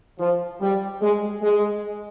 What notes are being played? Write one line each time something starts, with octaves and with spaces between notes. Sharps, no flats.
F3
G3
G#3
G#3